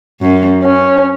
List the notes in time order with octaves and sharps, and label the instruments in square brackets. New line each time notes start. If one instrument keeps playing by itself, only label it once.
[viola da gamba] F#2
[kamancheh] C#4